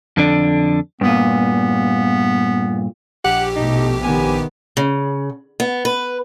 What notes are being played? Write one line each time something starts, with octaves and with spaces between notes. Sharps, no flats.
F2 D3 D4
G2 A#2 B3
A#1 G4 F#5
B2 A3 D#4
C3 D#3 B3 G#5
C#3
B3
B4